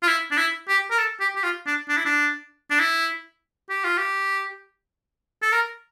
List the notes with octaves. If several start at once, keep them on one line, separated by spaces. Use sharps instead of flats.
F4
E4
D4
E4
G4
A#4
A4
G4
G4
F4
D4
D4
E4
D4
D4
E4
G4
F4
G4
A4
A#4